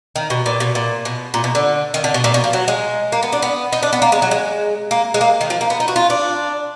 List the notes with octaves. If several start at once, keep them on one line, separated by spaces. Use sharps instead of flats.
D#3
B2
A#2
B2
A#2
B2
A#2
B2
D3
D#3
D3
B2
A#2
B2
F3
F#3
G#3
A#3
B3
D4
B3
D#4
D4
B3
A#3
G#3
F#3
G#3
A#3
G#3
A#3
D#3
F3
A#3
B3
D#4
F#4
F4
D4